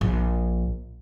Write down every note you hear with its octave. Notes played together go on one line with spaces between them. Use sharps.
A#1